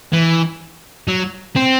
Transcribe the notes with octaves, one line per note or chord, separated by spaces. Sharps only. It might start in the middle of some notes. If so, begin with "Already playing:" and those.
E3
F#3
C4